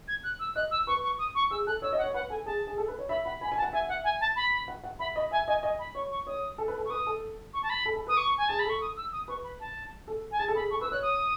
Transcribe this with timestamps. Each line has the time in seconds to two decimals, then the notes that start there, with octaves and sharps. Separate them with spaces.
0.08 G#6
0.24 F#6
0.40 E6
0.56 D#5 F#6
0.71 E6
0.87 B4 C#6
1.03 C#6
1.18 D#6
1.35 C#6
1.51 G#4 E6
1.67 A4 F#6
1.82 C#5 E6
1.93 D#5
1.98 F#5
2.04 C#5
2.14 B4 F#5
2.30 A4 G#5
2.46 G#4 A5
2.67 G#4
2.78 A4
2.88 B4
2.99 C#5
3.09 E5 B5
3.25 F#5 B5
3.41 G#5 B5
3.52 G#5
3.57 A5
3.62 F#5
3.73 E5 G#5
3.88 E5 F#5
4.04 G#5
4.21 A5
4.36 B5
4.68 F#5
4.84 F#5
4.99 E5 B5
5.16 D#5 B5
5.31 E5 G#5
5.48 D#5 G#5
5.63 D#5 G#5
5.79 B5
5.95 C#5 C#6
6.11 C#6
6.27 C#5 D#6
6.58 A4
6.68 B4
6.78 A4
6.85 C#6
6.90 B4 D#6
7.07 A4
7.54 C#6
7.63 A5
7.70 B5
7.85 A4
7.96 A4
8.07 B4 D#6
8.17 C#6
8.38 G#5
8.48 G#4 A5
8.59 B5
8.65 A4 C#6
8.81 D#6
8.97 E6
9.12 D#6
9.28 B4 C#6
9.44 B5
9.60 A5
10.08 A4
10.31 G#5
10.39 G#4 A5
10.48 A4
10.55 G#4 B5
10.71 A4 C#6
10.81 B4 E6
10.92 C#5 F#6
11.02 D#6